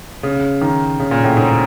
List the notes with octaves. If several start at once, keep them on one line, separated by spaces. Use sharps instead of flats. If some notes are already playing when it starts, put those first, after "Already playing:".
C#3
D#3
C#3
A#2
A2
G#2